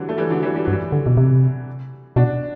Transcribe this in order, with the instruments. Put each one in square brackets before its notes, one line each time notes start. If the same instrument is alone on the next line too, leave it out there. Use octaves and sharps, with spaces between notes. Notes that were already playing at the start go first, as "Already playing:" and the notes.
Already playing: [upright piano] D3 E3 F#3 G3
A3
E3 G3
D3 F#3
E3 G3
G3
[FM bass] G2 [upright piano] F#3
[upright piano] E3 G3
[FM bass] D3
B2
C3
[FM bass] B2 [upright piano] D4 F#4